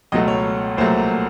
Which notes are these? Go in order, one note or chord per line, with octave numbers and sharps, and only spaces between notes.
C#2 B2 F#3 A3 D#5
C#5
C2 A#2 F#3 A3 C5